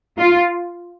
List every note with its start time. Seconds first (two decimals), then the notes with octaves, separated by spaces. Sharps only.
0.18 F4